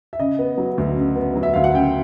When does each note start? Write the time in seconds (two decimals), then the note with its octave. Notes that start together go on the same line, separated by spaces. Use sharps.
0.13 E5
0.19 C#3 D#5
0.39 B3
0.58 F#3
0.78 D2
0.96 C#3
1.16 B3
1.35 F#3
1.43 E5
1.54 D2 F5
1.64 F#5
1.74 C#3 G5